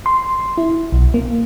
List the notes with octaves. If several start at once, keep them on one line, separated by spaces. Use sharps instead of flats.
C6
E4
B1
A#3